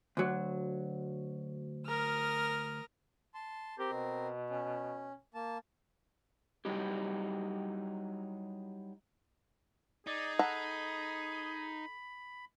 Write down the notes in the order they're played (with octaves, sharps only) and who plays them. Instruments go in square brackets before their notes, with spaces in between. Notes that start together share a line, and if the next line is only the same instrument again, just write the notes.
[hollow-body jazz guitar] D2 F#3
[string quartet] A#4 D#6 F6
[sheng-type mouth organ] A5 C6
[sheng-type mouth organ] C4 A#4 [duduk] G4
[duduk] B2
[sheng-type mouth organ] C#4
A#3 A5
[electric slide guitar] F#3 G3 D#4 E4 G4
[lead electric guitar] D#4 [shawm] G#4 [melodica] D5
[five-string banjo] A4 F#5 A#5 [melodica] B5